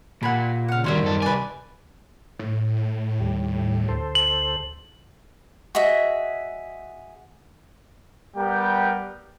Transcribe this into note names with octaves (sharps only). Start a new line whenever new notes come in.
A#2 G4 F#5 G#5 B5
C#3 F5 F#5
D#2 D#3 G3 F#4 C5 C#5 E5
F#2 A4
C2 B4 D5 G#5
A2
D#2 G3
D2 A4 C5
F#7
F#4 G#4 D#5 E5
G3 B3 G4 A#4 G5